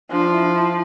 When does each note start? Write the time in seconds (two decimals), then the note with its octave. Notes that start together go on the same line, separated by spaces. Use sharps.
0.10 F3 D4
0.31 E4
0.52 E4